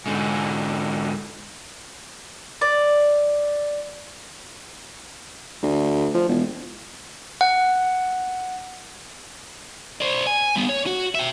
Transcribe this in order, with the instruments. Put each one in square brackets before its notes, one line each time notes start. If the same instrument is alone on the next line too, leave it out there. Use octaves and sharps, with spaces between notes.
[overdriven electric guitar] G#2 D3
[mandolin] D5
[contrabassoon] D2
F3
E1
[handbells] F#5
[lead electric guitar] C5 D5
G#5
G3 B3
C#5
F#4
E5 G5